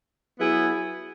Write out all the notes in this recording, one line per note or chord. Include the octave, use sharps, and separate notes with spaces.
F#3 B3 E4 G#4